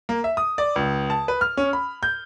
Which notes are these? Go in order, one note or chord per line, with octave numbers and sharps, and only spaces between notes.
A#3
E5
D#6
D5
C#2
A5
B4
F6
C#4
B5
G6